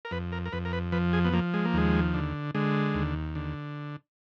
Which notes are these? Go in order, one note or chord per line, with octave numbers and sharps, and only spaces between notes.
A#4
F2 B4
A#4
A#4
F2 B4
A#4
B4
F3 B4
G#4
B3
F3 A#3
G#3
A#3
D#2 G#3
D3
D3 G#3
D#2
D3